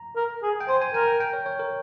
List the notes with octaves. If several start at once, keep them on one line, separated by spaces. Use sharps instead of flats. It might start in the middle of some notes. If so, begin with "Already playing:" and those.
Already playing: A#5
A#4
G#4
G5
C5 G#5
G#5
A#4 G#5
G5
G5
C#5
C#5
A#4